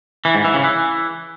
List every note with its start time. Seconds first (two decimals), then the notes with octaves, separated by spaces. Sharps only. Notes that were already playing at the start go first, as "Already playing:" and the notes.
0.25 E3
0.35 G#2
0.44 E3
0.54 C#3
0.64 E3